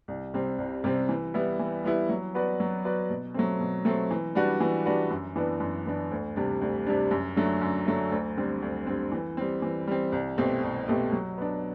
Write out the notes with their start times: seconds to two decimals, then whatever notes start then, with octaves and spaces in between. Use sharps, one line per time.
0.08 C2
0.34 C3 G3 C4
0.58 C2
0.84 C3 G3 C4
1.09 E3
1.34 G3 B3 E4
1.59 E3
1.84 G3 B3 E4
2.09 F#3
2.34 B3 F#4 B4 D5
2.60 F#3
2.85 B3 F#4 B4 D5
3.10 B2
3.34 F#3 A3 C4
3.60 B2
3.85 F#3 A3 C4
4.11 E3
4.35 G3 D4 F#4 B4
4.60 E3
4.86 G3 D4 F#4 B4
5.10 F#2
5.36 E3 B3 D4
5.60 F#2
5.86 E3 B3 D4
6.11 D2
6.36 C3 G3 D4
6.61 D2
6.86 C3 G3 D4
7.11 F#2
7.36 D3 F#3 A3
7.61 F#2
7.86 D3 F#3 A3
8.12 D2
8.37 D3 G3 C4
8.62 D2
8.87 D3 G3 C4
9.12 E3
9.37 G3 C4
9.62 E3
9.87 G3 C4
10.12 C2
10.38 B2 A3 C4 G4
10.63 C2
10.88 B2 A3 C4 G4
11.12 F#3
11.38 B3 D4